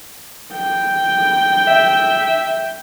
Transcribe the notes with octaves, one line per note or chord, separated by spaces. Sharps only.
G5
E5